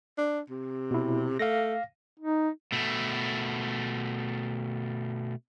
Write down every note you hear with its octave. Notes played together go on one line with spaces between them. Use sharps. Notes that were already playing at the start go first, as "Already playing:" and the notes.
D4
C3
B2 E4
A3 F5 A#6
D#4
B2 A3